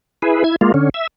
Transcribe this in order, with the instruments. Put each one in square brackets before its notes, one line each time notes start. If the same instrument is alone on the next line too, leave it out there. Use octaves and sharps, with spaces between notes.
[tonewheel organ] E4 G#4 B4
E4 G#6
G#3 A#3 F4
D3 C#4
E5